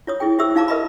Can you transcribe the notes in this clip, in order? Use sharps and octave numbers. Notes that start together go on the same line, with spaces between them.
F4 C#5 D#6
E4 F4 G#4 G5
F4 G4 C5 E5 D#6 E6
D#4 F4 F5 A5 A#5 D6
A#4 B4 D#5 E5 A#5 B5